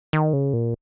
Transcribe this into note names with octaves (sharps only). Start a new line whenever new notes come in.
D#3
C#3
A#2